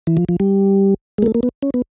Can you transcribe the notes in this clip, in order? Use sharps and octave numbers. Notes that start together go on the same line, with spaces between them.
E3
F3
F3
G3
G#3
A#3
A3
A#3
B3
C#4
B3